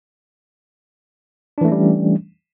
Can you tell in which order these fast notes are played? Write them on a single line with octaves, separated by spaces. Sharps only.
D4 E3 A3 C#4 G3